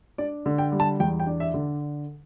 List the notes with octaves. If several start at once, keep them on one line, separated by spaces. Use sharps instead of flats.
D4 D5
D3
G5
G3
A5
E2 G5
G5
D4
E5
D3